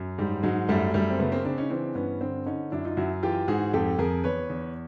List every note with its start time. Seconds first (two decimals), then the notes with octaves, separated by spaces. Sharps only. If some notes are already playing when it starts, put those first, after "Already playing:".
Already playing: F#2
0.18 G#2 G3
0.43 G#2 F#3 G#3
0.69 F#2 G3 A3
0.94 F#2 G3 A3
1.10 C4
1.19 C#3 A3 B3
1.32 A#3 C4
1.45 C#3 C4 D4
1.58 C#4 D#4
1.70 E3 C4 D4
1.95 G2 B3 C#4
2.21 D3 C4 D4
2.46 D3 C#4 D#4
2.72 F#2 D4 E4
2.85 D#4 F4
2.97 F#2 E4 F#4
3.23 E3 F4 G4
3.48 G#2 F#4 G#4
3.73 F2 G4 A4
3.99 F2 G#4 A#4
4.24 E2 B4 C#5
4.50 E2